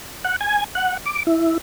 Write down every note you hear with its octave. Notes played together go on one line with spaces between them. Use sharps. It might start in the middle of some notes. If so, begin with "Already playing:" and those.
F#5
G#5
F#5
D6
E4